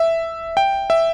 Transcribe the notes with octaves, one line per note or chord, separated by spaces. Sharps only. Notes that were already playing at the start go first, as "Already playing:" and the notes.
Already playing: E5
G5
E5